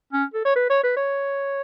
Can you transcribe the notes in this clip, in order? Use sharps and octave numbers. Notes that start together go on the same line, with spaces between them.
C#4
A4
C#5
B4
C#5
B4
C#5